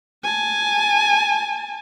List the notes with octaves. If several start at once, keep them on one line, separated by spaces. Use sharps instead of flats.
G#5 A5